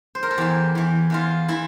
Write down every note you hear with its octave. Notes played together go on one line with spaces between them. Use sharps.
C5
A#4
A4
E2 E3 G4
E2 E3
E2 E3 F4
E3 E4